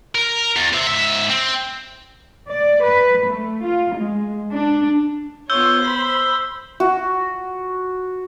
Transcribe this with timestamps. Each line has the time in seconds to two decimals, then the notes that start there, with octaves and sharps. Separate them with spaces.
0.15 A#4
0.56 E2
0.73 C5 E5
0.87 G#2 E5
1.30 C4
2.48 D5
2.83 B4
3.27 A3
3.63 F4
3.94 G#3
4.52 D4
5.50 B3 F4 C#5 E6 G6 G7
5.82 C5 B5
6.80 F#4